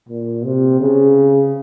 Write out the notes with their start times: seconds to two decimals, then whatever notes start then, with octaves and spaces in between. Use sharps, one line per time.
0.09 A#2
0.44 C3
0.80 C#3